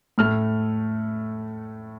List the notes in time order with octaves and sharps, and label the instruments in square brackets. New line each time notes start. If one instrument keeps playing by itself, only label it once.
[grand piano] A2 A3 F6